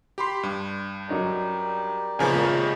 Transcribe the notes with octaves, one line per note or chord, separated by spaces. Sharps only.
G4 B5 C6
G2
F#3 C#4 D#4 G4 A#4 D5
A#1 C#3 F3 B3 D#4 G#5
G#1 C3 G#3 G4 A#4